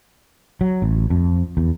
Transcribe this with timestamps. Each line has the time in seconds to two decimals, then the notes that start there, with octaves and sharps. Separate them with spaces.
0.61 F#3
0.82 A1
1.10 F2
1.57 E2